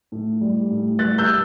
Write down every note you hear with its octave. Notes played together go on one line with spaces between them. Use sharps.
A2
G3
A2
G3 F#6 A6
E6 G6